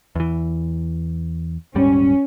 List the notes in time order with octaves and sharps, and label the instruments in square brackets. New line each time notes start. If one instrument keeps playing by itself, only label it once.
[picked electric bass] E2 E3
[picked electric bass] D#1 G#2 G3 [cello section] C#4